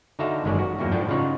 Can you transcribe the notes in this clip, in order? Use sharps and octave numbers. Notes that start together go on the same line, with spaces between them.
D3 D#4 F#4 E5 F5 A5
G1 F#2 D#3 G#3 C#4 D5
F#4
E2 G2 F#3 A#3
A2 F3 D4 G5
C#3 D#4 F4 C#5 F#5